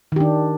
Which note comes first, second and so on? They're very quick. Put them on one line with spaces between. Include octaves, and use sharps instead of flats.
D#3 G4 D4